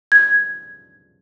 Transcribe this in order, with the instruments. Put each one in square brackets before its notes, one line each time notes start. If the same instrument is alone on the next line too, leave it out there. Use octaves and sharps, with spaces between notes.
[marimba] G#6